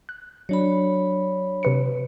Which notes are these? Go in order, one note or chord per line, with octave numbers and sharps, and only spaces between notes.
F#6
F#3 D4 C#5 B5
C3 B4 C#7